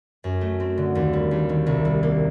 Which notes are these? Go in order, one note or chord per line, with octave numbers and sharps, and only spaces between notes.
F#2
A3
C4
D3
D#2
G3
D#2
D#3
C2
G3
A#3